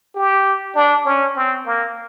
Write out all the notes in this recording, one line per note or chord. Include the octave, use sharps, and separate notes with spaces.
G4
D4
C#4
C4
A#3